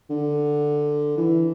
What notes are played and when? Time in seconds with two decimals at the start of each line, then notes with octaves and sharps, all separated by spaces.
0.10 D3
1.17 E3